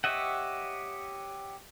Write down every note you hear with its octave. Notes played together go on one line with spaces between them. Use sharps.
G4 C#5 D#5 E5 F#5